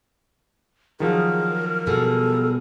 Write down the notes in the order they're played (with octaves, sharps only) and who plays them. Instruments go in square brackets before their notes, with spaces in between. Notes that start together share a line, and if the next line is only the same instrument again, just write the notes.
[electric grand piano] D#3 F3 F#3 [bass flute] G#4 [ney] A#4
[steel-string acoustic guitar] B2 G3 G#4 [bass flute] A4